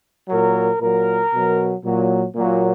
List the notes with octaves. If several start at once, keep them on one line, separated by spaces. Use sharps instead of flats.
A#2 F#3 A#4
A#2 F#3 A#4
B2 F#3
A#2 F#3
A#2 F#3